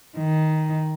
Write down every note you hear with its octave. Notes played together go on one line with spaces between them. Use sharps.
D#3